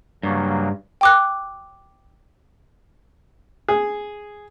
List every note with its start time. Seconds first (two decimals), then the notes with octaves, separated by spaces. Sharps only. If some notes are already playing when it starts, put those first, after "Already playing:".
0.23 G2 C#3 F#3 A#3
1.01 G5 D6 F#6
3.68 G#4